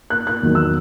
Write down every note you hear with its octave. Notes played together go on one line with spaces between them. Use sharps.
F#6
F#6
E2 D#3 F#3
E6